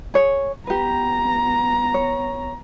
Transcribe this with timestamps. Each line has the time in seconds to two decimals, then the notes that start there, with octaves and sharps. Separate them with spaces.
0.14 G#4 C#5
0.67 B3 G4 B4 A#5
1.94 C#5